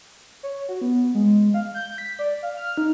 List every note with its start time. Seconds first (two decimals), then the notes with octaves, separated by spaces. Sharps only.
0.43 C#5
0.69 F#4
0.82 B3
1.15 G#3
1.54 F5
1.75 G6
1.98 B6
2.19 D5
2.43 F5
2.57 F6
2.78 D#4